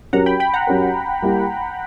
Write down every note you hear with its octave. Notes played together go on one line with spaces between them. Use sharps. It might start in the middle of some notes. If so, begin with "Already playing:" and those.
F#3 C#4 G4 A#4 F#5 A#5
G5 B5
G5 B5
F#5 A#5
F#3 C#4 G4 A#4
G3 A#3 E4